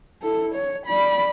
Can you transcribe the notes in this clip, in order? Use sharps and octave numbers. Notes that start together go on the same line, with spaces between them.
E4 A4
C#5
D5 B5